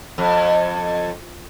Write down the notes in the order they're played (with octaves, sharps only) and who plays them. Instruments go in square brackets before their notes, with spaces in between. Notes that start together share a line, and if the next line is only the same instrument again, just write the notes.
[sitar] F2